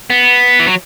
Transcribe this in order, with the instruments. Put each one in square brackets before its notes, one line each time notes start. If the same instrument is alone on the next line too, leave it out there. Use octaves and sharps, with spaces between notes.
[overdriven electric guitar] B3
E3
F#3